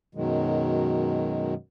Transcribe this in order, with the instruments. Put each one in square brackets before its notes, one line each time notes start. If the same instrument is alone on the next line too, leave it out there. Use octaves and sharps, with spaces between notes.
[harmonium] F#2 B2 D#3 F#3 G#3